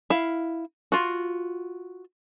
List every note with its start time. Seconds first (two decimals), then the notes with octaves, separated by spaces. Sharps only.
0.10 E4 F5
0.92 F4 F#4